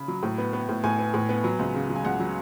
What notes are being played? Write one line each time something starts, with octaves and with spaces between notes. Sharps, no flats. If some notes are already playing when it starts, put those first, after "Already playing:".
Already playing: C#3 B5
F#3
A2
B3
B3
A2
A2 G#5
B3
A2
B3
F#3
C#2
C#3
F#3
G#5
C#2 F#5
F#3